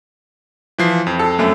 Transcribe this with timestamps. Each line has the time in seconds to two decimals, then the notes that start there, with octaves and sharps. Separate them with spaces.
0.78 E3 F3 C7
1.07 F2
1.19 A4
1.39 F#2 A3